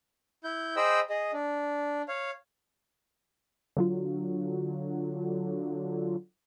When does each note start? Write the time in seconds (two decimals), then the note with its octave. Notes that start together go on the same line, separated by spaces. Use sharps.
0.44 E4 G6
0.76 G#4 C5 D#5 G5 B5 E6
1.10 G#4 D#5
1.33 D4
2.09 C#5 F5
3.77 D3 F#3 F4